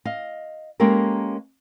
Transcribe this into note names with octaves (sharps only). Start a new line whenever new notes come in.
D#5 F5
G#3 A#3 C#4 G4 A4 A#4